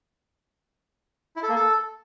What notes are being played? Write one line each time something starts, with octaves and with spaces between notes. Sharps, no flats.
E4
A4
A#3
A4